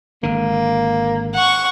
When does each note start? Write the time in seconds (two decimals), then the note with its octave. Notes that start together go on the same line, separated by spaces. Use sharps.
0.23 G#1 D3 A#3
1.34 F#5 C#6